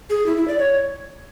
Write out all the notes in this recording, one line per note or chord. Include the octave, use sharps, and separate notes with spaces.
G#4
E4
E4
D5
C#5